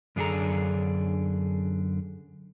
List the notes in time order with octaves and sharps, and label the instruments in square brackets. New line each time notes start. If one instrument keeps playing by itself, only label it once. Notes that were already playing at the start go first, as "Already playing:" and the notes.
[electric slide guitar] F#2 D3 D4 G#4 A4 A#5